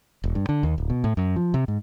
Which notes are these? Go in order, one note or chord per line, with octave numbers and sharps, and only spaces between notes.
E1
G2
D3
D#2
D1
B2
A2
F#2
F3
C3
G#2